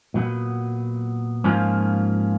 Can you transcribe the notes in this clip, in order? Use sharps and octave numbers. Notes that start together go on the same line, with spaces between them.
A#2 F#3 B3
G#2 F3 A#3 C#4 F4